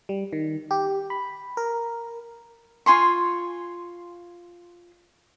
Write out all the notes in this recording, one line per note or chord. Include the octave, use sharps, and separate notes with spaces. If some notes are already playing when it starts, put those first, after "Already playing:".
G3
D#3
G4
B5
A#4
F4 G#5 C6 C#6